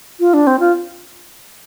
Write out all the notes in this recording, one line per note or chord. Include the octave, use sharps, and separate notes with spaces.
F4
D4
C4
F4